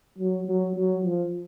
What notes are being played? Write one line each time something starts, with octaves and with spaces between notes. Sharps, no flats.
F#3
F#3
F#3
F3